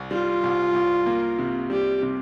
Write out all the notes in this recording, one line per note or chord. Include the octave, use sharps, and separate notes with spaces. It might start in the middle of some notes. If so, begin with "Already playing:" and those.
Already playing: C2
G3 F4
C2
C2
A#3
C3
G3 G4
C3